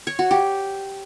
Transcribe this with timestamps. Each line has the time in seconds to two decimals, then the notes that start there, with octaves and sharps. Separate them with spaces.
0.07 C#5
0.19 F#4
0.31 G4